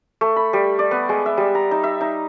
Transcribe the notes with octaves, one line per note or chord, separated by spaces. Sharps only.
A3
B5
G3
D5
B3
G#3
E5
G3
A#5
D#4
E5
D#4